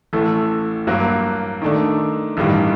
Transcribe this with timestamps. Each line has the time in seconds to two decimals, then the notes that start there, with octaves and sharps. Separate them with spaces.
0.13 A1 A2 A3
0.87 G2 F#3 A#3
1.62 D#3 A3 D4
2.37 A1 G2 D#3 G3